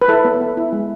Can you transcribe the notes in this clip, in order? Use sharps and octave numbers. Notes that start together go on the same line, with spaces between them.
B4
E4 A4
B3
B3
E4
G#3